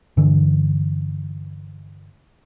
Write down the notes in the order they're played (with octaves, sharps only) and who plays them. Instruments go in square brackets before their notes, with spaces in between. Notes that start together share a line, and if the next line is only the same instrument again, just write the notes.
[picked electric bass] G2 D3 E3